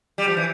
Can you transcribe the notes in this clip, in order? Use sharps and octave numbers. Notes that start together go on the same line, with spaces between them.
G3
F3
E3